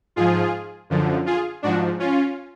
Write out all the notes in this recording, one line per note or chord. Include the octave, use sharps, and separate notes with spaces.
G#2 F3 F4 G#4
F#2 D3 F3
F4 G#4
G#2 F3 D4 F#4
C#4 F4